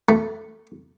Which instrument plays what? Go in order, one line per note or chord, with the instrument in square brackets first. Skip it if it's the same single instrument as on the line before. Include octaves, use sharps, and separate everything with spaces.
[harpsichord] A3